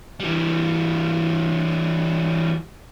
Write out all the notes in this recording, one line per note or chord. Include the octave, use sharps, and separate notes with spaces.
E3 G3